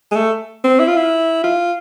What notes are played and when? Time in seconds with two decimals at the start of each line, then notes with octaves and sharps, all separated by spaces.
0.11 G#3
0.16 A3
0.64 C4
0.79 E4
0.87 F4
0.96 E4
1.44 F4